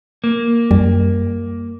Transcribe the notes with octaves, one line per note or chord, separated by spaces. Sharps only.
A#3
F#2 G3